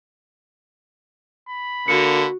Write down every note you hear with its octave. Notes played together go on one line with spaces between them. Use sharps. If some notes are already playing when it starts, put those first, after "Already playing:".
B5
D3 A#3 F#4 C#7